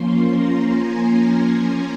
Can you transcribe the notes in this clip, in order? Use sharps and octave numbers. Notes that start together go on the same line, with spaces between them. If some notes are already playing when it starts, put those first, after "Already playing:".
Already playing: F3 A#3 C#4 C6
A#5
G#5